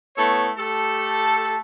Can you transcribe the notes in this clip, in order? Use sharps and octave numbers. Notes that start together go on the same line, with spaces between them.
A3 B3 E4 A4 C#5
A3 G4 A4